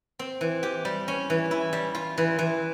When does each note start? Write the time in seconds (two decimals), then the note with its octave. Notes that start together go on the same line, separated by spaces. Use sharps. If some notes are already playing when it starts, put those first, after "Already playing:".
0.19 C4
0.41 E3
0.63 G4
0.85 G3
1.08 C#4
1.30 E3
1.51 E4
1.73 G3
1.95 F4
2.18 E3
2.39 E3